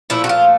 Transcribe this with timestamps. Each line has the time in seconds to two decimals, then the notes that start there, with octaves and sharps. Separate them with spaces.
0.10 A#2 F3 A3 E4
0.24 F#4
0.29 F4